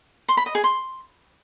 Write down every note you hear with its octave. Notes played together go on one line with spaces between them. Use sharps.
C6
B5
D#5
G#4
C6